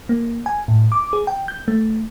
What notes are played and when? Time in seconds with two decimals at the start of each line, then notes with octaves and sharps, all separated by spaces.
0.09 A#3
0.46 G#5
0.68 A2
0.92 D6
1.13 G#4
1.27 G5
1.48 G6
1.68 A3